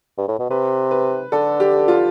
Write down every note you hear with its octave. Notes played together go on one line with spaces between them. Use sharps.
G2
A2
B2
C3 B4
B4
D3 A4
G4
F4